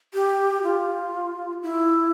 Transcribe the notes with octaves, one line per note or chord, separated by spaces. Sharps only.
G4
F4
E4